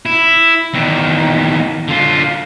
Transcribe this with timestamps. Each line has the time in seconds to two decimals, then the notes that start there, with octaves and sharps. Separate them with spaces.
0.06 E4
0.74 E2 D#3
1.88 D3 F4